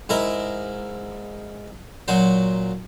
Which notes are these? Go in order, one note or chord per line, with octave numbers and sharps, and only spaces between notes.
G#2 E4 A#4
A#2 F#3 C5